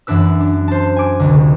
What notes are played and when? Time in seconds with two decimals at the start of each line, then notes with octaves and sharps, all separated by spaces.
0.07 F#2 E3 D4 B4 E6
0.40 D4
0.68 C5 A5
0.96 G#5 D6
1.20 F1 C#2 D3